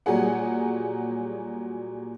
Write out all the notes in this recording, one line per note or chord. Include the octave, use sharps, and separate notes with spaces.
A#2 F#3 G3 G#4 F#5